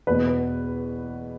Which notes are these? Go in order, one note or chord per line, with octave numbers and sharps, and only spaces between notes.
E2 B2 B4
B4